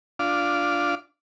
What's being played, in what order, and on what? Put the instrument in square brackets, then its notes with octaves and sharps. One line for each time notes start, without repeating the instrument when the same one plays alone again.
[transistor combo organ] D4 F4